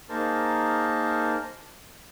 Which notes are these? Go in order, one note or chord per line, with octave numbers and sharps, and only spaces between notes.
A#3 D#4 G#4 A#4 C5 A5